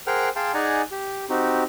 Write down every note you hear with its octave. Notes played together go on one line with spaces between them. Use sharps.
G#4 A#4 C5 F#5 G5 F6
G#4 F5 G5 A5 C6
D#4 G#4 D5 F#5 G#5 A#5
G4
C4 D#4 F#4 G4